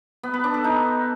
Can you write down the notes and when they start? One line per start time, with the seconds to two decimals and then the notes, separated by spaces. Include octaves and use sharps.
0.23 B3
0.34 B4
0.44 D4
0.54 A4
0.64 D#4